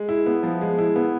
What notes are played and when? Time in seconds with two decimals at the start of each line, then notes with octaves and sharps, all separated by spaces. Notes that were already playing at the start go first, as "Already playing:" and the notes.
Already playing: G#3
0.09 E4
0.26 B3
0.43 F3
0.61 G#3
0.78 E4
0.96 B3